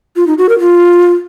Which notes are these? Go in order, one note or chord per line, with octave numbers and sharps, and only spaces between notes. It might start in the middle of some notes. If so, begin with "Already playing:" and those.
F4
D#4
F#4
A#4
F4